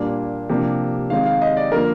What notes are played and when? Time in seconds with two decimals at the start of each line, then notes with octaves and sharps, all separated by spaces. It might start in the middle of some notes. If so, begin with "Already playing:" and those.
Already playing: A#2 G3 A#3 D4
0.49 C3 F3 A#3 D4
1.10 D#3 G#3 C4 F5
1.26 F5
1.42 D#5
1.57 D5
1.71 D3 F3 A#3 A#4